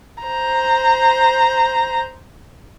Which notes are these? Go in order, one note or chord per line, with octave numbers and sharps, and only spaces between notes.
C5 A#5